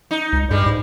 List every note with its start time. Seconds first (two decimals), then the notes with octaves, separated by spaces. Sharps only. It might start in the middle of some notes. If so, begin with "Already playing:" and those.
0.11 D#4
0.33 C#2
0.51 G2 G3 G#3
0.66 G#2